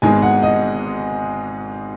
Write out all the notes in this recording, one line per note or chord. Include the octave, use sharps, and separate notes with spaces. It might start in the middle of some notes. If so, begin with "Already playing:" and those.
G#1 G#2 G#3 B3 G#5
F#5
D#5